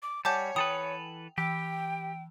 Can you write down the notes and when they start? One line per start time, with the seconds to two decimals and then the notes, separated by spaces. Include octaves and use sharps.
0.03 D6
0.25 G3 C#5 F#5 G#5 A5 D6 G6
0.56 E3 A4 B4 G5 D#6 F7
1.38 E3 G4 G5